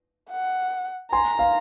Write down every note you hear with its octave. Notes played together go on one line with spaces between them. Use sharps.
F#5
G#5 A#5 C6
F5